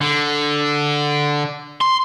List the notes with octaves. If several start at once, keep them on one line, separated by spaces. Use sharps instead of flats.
D3
C6